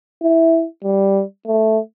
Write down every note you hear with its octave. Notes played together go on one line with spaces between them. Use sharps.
E4
G3
A3